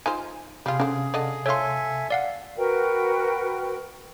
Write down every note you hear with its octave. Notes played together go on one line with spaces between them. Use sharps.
D#4 F4 C5 G#5
C3 G3 F4 G#4 F5
D3 C4 C#4
D3 D5 D#5
A3 F4 A4 C#5 E5 G#5 C6
D5 F5 F#5
F#4 A#4 B4 G5